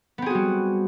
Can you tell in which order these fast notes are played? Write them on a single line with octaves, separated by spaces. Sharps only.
B3 C4 G#4 F#4 G3